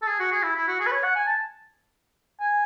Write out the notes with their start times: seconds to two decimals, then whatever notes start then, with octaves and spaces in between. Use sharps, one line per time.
0.02 A4
0.07 G#4
0.19 F#4
0.32 G#4
0.43 E4
0.56 E4
0.68 F#4
0.80 G#4
0.87 B4
0.91 C#5
1.03 F#5
1.15 G#5
1.27 A5
2.41 G#5